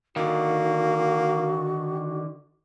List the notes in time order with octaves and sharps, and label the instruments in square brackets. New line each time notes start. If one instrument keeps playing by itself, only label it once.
[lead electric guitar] D3 D#3 [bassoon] A#3 [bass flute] F#4